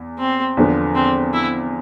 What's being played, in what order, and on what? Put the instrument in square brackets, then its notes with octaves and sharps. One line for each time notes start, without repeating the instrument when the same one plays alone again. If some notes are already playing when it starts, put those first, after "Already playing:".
Already playing: [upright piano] E2
[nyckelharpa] C4
[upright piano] E2 D3 F3 B3
[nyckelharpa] C4
E4